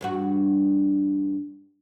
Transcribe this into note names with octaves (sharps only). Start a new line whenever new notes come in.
E2 G2 F#4